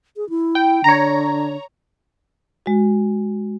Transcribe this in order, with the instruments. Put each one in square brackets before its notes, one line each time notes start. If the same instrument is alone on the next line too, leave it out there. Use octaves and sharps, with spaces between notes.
[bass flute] G#4
E4
[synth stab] G5
[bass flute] D3 [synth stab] C#5 A#5
[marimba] G#3 F#4